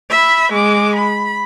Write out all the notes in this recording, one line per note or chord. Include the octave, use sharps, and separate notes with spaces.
E5 B5
G#3 D6
B5